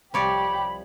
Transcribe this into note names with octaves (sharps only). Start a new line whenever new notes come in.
C2 F3 G4 C#5 D5 B5